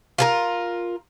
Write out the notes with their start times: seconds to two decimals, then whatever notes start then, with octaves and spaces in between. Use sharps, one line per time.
0.18 F4 G#4 A#4